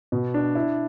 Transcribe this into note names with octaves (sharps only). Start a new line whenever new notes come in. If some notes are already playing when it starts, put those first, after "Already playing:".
B2
D4
E4